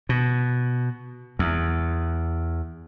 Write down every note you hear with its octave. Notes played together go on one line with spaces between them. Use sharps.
B2
E2